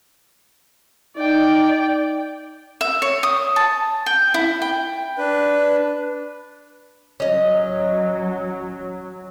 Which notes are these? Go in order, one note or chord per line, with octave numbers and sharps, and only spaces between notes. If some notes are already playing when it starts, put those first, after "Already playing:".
D#4 D5 G5
E5
C#5
D#6
A5
G5
E4
G5
D4 B4
F#3 C#4 D#5